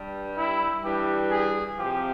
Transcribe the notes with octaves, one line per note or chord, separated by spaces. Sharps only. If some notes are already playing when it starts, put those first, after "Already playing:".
Already playing: G2 G3
E4
G2 E3 G3 G4
G#4
C3 F3 G4